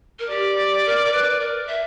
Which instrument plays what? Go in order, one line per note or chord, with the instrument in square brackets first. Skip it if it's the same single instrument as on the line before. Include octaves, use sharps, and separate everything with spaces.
[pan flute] A#4
[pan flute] G4 [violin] D5
[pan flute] A#4
A#4
B4
A#4
E5